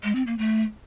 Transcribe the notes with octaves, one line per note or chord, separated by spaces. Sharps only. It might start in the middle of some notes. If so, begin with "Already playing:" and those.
G#3
C4
A#3
A3